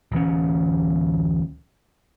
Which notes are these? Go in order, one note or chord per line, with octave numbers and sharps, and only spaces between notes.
D1 E3 C#4